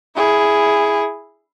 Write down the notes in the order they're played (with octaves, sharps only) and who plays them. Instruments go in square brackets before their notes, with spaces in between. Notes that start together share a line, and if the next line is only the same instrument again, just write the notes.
[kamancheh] E4 G#4